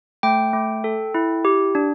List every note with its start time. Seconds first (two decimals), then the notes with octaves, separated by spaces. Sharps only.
0.23 A3 G5
0.53 A3
0.84 A4
1.14 E4
1.45 G4
1.75 D4